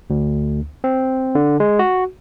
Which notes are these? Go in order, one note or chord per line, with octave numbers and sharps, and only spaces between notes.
D2
C4
D3
G#3
F#4